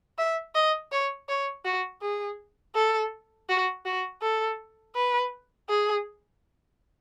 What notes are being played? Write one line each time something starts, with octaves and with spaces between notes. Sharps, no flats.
E5
D#5
C#5
C#5
F#4
G#4
A4
F#4
F#4
A4
B4
G#4